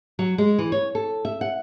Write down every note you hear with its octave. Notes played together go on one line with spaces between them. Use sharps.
F#3
G#3
E3
C#5
A4
E5
F#5